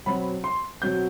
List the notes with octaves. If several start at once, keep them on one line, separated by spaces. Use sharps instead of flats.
B2 F#3 C4 B5
C6
B2 F#3 C4 G6